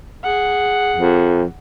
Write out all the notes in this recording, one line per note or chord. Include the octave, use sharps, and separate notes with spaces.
G#4 F#5
F2